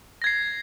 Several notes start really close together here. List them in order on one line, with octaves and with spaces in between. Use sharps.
A#6 G#6 C7